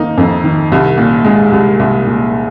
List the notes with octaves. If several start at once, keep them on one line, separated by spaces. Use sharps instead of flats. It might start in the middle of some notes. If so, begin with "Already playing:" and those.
Already playing: F2 D#3 A#3 D#4
F2
D#3
C2
A#2
G#3
C2
C2
A#2